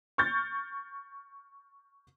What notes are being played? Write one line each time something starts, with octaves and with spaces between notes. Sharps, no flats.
C#6 F6 G6 A6